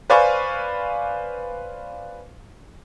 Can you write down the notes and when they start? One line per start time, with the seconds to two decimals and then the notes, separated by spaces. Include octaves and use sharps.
0.10 B4 C5 D5 F5 G#5 C#6